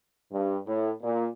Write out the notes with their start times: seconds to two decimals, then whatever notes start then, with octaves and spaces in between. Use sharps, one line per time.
0.33 G2
0.67 A2
1.02 A#2